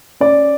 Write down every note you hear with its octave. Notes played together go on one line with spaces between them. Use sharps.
C#4 D5